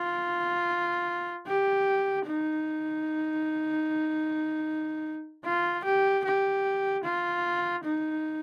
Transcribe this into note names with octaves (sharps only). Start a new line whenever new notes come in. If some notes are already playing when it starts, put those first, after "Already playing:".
Already playing: F4
G4
D#4
F4
G4
G4
F4
D#4